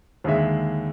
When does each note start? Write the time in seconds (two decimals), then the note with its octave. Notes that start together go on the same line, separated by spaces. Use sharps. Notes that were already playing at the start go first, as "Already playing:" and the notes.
0.24 D#2 D3 G#3 E5